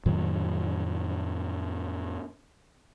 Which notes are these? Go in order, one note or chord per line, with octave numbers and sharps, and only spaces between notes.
F2 A2 D#3 F#3